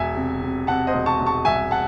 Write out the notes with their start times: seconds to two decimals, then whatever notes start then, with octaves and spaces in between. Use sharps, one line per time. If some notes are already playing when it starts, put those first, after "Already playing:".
Already playing: E1 E5 G#5
0.16 C3
0.42 C3
0.67 C3 F#5 A5
0.87 C5 D#5
0.94 E1
1.06 A5 C#6
1.20 E1
1.26 A5 C#6
1.45 C2 E5 G#5
1.71 F#5 A5